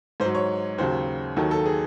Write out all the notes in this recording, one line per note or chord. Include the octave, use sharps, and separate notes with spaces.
G#2 C5
F#3
C#5
D#2 C#3 F#3 C5
D#2 D#3 F#3 A4
A4
G#4